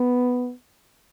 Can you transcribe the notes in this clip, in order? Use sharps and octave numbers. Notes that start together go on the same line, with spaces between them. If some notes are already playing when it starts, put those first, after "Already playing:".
Already playing: B3